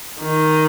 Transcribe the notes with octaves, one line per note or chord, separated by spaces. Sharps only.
D#3